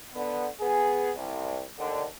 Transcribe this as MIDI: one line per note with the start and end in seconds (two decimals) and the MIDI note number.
0.14 0.46 50
0.14 0.46 59
0.61 1.11 59
0.61 1.11 68
1.17 1.63 36
1.79 2.03 39
1.79 2.03 50